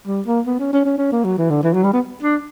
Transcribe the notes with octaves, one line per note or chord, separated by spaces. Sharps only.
G3
A#3
B3
C#4
C#4
C#4
C#4
A#3
F#3
E3
D3
E3
F#3
G3
B3
D4